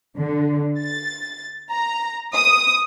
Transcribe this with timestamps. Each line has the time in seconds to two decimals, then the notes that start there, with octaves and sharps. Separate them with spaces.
0.18 D3
0.79 A6
1.70 A#5
2.35 D#6